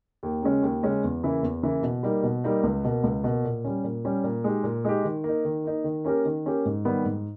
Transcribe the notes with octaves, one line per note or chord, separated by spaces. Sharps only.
D#2
C#3 G#3 C#4
D#2
C#3 G#3 C#4
E2
C#3 E3 A#3 E4
E2
C#3 E3 A#3 E4
B2
G3 A#3 D#4
B2
G3 A#3 D#4
C#2
B2 A#3
C#2
B2 A#3
A#2
G3 C#4
A#2
G3 C#4
A#2
G#3 D#4 G4
A#2
G#3 D#4 G4
D#3
A#3 D#4
D#3
A#3 D#4
D#3
A#3 C#4 G4 A#4
D#3
A#3 C#4 G4 A#4
G#2
D#3 G3 B3 G4
G#2